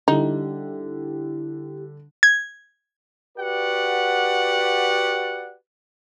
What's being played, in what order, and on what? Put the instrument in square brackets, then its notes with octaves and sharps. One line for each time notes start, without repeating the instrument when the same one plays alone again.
[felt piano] D3 G3 [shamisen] D#4 [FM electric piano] E4 G4
[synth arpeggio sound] G#6
[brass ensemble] F#4 G4 B4 D5 F#5